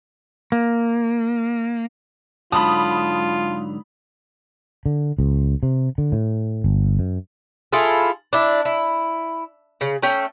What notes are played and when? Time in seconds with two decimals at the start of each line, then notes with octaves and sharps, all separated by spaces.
0.52 A#3
2.52 G#2 D3 F#3 F4 A5 B5 D#6
4.86 D3
5.19 C#2
5.63 C3
5.98 D3
6.12 A2
6.64 G1
6.99 F#2
7.73 E4 F4 G#4 A4
8.33 D4 E4
8.65 E4
9.81 C#3
10.03 A3 C#4 G5